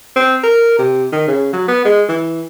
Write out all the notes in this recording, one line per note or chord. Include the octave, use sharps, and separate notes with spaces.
C4
A#4
C3
D#3
C#3
F#3
B3
G#3
E3